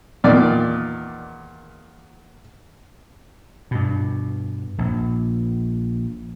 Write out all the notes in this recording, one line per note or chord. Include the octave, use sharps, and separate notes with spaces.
E2 A#2 D#3 D5 D6
G2 B2
A#1